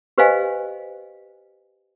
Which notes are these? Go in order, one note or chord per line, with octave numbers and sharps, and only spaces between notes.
G4 B4 C5 D#5 F5 G#5